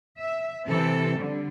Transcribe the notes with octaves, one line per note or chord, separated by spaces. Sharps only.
E5
C3 E3 C4 A4
D3 G3